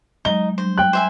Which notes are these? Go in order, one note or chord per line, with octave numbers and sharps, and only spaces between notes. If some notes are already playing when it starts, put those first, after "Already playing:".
F#3 G#3 D#4 G7
F#3 G3 D4 C5
G5 F#6
C5 E5 G#5